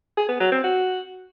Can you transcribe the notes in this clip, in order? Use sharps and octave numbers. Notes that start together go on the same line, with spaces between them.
G#4
B3
F#3
C4
F#4